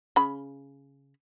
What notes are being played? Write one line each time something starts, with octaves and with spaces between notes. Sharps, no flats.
C#3 B5